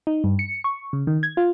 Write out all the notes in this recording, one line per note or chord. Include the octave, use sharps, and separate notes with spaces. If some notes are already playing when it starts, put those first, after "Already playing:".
D#4
G2
C#7
C#6
C#3
D#3
G#6
F4